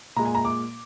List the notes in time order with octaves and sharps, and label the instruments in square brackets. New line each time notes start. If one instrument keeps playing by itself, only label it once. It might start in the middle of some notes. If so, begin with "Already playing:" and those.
[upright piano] A#2 G#3 A#5
G#5
A#5
D6